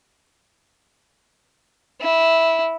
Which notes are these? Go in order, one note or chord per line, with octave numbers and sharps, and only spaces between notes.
E4